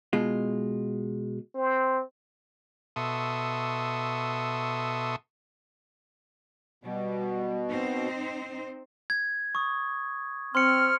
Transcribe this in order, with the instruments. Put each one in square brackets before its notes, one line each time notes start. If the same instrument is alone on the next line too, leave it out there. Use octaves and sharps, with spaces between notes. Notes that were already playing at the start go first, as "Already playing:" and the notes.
[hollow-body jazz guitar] B2 G#3 F4
[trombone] C4
[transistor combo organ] B2 A4 E5 C6 C#6 D#6
[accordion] B2 [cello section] G3
[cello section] C4 D#4 C5
[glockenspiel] G#6
C#6 D#6
[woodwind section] C4 F6 [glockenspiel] C6 C#7